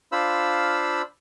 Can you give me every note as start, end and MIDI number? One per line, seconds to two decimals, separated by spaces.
0.12 1.02 62
0.12 1.02 65
0.12 1.02 72
0.12 1.02 77
0.12 1.02 83
0.12 1.02 88